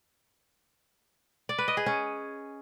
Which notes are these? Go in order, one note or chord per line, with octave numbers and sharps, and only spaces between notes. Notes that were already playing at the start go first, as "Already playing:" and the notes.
D5
B4
D#5
G#4
C#4